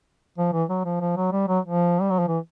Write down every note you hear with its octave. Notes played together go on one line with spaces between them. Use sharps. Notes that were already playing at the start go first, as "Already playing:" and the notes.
F3
E3
F#3
F3
F3
F#3
G3
F#3
F3
G3
F#3
F3
E3